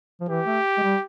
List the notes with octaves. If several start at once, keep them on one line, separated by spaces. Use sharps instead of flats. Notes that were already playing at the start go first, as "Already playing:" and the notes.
F3
E3 G4
A3
G#3
G3